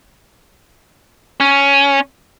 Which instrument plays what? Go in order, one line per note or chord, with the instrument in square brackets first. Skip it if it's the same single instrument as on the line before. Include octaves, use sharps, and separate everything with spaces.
[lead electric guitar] C#4